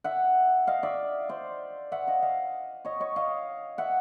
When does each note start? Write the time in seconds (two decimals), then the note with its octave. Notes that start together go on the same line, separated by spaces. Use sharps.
0.04 E5 F#5
0.67 D#5 F5
0.83 D5 E5
1.29 C5 D5
1.92 E5 F#5
2.07 D#5 F5
2.22 D#5 F5
2.85 C#5 D#5
3.00 C#5 D#5
3.16 D#5 F5
3.78 E5 F#5